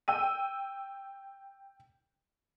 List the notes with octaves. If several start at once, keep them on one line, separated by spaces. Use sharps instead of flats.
G5 E6 D#7